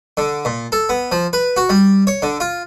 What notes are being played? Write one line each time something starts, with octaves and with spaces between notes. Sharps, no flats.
D3
A#2
A4
B3
F3
B4
F#4
G3
C#5
D3
F4